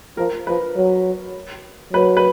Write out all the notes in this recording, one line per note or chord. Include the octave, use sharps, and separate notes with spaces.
F3 A#4
F3 B4
F#3
F#3 B4
B4